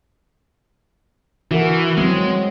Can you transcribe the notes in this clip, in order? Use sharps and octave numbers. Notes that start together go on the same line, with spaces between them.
E3 F#4 A#4
F#3 G#3 C4